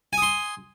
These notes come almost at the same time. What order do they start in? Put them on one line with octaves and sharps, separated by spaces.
G#5 D#6 C6